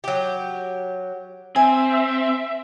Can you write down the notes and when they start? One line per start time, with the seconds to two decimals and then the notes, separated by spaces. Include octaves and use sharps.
0.04 F#3 G4
1.56 C4 E5 G#5